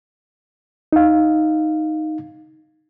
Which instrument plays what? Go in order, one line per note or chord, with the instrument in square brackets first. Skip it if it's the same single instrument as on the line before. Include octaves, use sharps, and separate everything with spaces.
[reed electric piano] D#4 F5